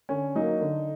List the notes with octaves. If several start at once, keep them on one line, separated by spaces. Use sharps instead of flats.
D3 C#4
F#3 A#3 D#4
D3